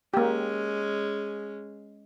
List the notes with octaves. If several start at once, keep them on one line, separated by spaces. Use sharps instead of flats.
G#3 A#3 C#4 G4